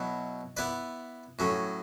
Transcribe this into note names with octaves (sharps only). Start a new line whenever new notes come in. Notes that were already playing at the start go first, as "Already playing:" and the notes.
Already playing: B2 F#3 B3 E4
B3 E4 B4 D5
A2 F#3 C#4